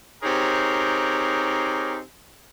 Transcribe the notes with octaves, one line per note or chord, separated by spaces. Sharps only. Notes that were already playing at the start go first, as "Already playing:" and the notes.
C4 D#4 G4 G#4 A#4 C#5